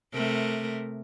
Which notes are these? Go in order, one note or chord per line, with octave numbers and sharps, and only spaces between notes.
C3 A3 A#4